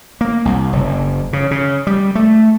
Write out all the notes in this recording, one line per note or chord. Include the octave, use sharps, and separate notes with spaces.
A#3
C2
F#1
C#3
C#3
G3
A3